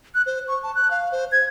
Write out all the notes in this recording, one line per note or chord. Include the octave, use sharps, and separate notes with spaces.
F#6
C5
C#6
A5
F#6
F5
C5
G#6